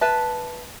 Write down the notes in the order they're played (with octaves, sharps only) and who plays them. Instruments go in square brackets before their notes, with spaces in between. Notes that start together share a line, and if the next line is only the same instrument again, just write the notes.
[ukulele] B4 E5 A5